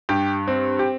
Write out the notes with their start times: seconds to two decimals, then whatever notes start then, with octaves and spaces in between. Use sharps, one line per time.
0.09 G2 G4
0.47 C4
0.79 G4